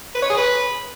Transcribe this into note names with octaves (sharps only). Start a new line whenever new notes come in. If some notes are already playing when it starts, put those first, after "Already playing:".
B4
C#5
G#4
B4